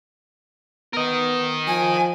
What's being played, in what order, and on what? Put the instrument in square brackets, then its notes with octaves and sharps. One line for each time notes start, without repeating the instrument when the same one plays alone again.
[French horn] B3 [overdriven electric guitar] A#4 D#5
[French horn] F3 [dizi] G#5